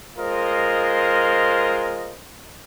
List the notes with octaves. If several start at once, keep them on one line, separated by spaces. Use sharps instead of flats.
G#3 F4 A#4 C5 D#5